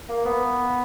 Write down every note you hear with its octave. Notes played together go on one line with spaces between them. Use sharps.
A#3
B3